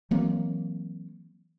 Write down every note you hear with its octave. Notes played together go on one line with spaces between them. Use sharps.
E3 F#3 A#3 C4